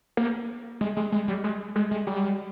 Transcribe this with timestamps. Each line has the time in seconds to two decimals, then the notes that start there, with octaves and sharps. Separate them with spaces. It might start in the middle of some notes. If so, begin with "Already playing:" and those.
0.17 A#3
0.81 G#3
0.97 G#3
1.12 G#3
1.28 G3
1.44 G#3
1.76 G#3
1.91 G#3
2.07 G3